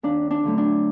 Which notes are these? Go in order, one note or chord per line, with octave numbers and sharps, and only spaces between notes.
D#2 D4
D4
D3 F#3 A3
D4